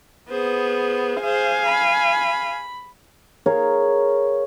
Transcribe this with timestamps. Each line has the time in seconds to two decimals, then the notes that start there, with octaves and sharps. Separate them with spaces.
0.31 B3 G#4 C5
1.21 G#4 C5 F5 G#5
1.66 B5
3.46 G#4 A#4 C#5 F5